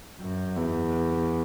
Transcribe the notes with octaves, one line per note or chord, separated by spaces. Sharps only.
F#2
E2